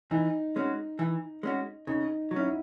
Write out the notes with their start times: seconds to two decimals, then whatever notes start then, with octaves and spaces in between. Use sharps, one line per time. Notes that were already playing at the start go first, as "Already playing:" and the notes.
0.11 E3 D#4
0.56 G#3 C#4 F#4
0.99 E3
1.43 G#3 C#4 F#4
1.87 C#3 D#4
2.31 F#3 F#4
2.36 C#4 E4
2.47 D#4